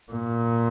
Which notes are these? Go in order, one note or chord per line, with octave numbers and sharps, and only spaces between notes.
A#2